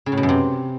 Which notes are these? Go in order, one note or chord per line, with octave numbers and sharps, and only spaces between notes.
C#3
A2
B2
F#2
C3